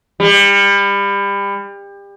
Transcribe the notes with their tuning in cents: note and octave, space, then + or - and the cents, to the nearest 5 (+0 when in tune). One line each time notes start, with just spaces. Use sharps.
G3 +30